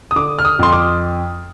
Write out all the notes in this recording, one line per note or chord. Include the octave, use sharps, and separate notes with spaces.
D#6
D3 D6
F6
D#6
F2 C6
D6